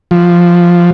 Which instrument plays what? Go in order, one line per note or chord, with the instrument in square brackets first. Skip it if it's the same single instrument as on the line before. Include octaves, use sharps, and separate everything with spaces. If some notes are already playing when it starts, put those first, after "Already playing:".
[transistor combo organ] F3